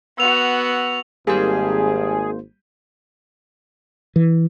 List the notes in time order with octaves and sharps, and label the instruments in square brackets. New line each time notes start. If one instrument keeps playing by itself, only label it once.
[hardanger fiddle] B3 F#4 [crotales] E6 F7
[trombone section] G#1 [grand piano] G3 [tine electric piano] A#3 C5 [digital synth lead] G#4
[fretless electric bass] E3